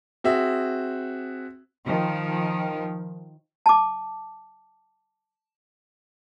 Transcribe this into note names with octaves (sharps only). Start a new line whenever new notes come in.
C4 F#4 G#4 E5
D#3 F3
A5 D6